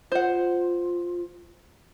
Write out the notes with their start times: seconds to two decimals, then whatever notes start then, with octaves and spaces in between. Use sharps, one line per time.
0.12 F4 C5 F#5